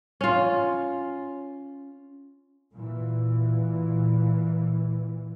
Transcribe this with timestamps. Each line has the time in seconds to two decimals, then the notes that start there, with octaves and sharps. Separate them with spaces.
0.21 C#4 F4
2.74 A#2 E3